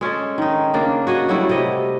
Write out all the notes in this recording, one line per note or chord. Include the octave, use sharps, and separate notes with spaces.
G#3 C#4 G#4 A4
D#3 D#4
C#3 A#3 D4
F#4 G#4 D#5
F#3 G3 A3 E4
C3 D#5